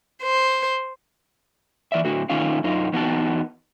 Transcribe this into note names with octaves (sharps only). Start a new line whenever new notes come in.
C5
E3 D5 E5
A2 D3 F#4
D#3 A3 C#4 D#4 F4 F5
F#2 D#4 F4
E2 B3 D#4 F#4 A5